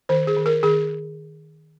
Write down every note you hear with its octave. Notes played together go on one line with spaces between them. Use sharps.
D#3 C5
G#4
D#3
A#4
D#3 G#4